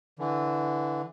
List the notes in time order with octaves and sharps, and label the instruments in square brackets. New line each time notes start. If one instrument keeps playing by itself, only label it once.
[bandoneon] D3 E3